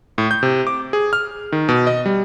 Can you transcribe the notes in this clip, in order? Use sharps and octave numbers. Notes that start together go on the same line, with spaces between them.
A2
G6
C3
D6
G#4
F6
D#3
B2
D#5
G3